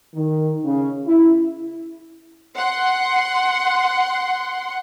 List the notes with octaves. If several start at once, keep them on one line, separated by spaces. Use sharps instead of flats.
D#3
C#3
E4
F#5 C6